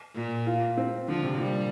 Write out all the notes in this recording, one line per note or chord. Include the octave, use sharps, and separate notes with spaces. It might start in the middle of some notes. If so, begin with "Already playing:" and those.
A#2
F4
C4
D3 F3
C3
A#2 G3